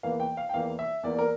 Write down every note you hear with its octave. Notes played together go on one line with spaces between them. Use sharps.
E2 E3 A#3 F5
G5
F5
G5
E2 E3 A#3 F5
E5
E2 E3 A#3 D5
A#4